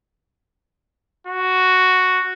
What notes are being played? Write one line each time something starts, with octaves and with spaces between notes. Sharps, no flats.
F#4